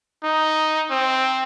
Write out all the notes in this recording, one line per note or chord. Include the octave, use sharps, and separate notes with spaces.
D#4
C4